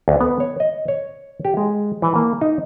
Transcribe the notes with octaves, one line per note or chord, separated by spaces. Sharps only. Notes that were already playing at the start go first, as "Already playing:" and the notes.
D2
B3
C#5
D#5
C#5
G4
G#3
E3
A#3
D#4